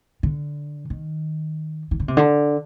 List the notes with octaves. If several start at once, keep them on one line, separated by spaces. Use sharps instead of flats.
D3
D#3
D#3
D3
C3
D3